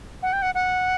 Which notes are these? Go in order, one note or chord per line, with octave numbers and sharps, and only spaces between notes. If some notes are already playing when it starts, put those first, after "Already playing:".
F#5
G5
F#5
F#5